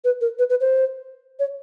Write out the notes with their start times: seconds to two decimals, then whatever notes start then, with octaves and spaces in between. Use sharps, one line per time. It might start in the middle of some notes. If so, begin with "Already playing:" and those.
0.04 B4
0.21 A#4
0.39 B4
0.50 B4
0.61 C5
1.39 C#5